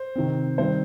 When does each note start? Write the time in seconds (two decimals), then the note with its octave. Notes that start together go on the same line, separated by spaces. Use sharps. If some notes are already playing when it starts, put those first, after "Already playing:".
Already playing: C5
0.15 C3 D#3 C4
0.58 D#3 G3 C4 C5